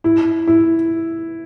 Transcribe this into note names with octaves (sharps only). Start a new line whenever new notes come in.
E4
E4